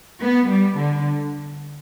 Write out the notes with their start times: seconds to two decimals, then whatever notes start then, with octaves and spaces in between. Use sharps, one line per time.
0.22 B3
0.50 G3
0.79 D3